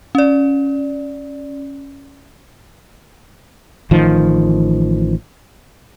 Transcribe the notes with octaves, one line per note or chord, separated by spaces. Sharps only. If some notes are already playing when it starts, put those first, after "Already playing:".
C#4 D5
A1 D#3 F3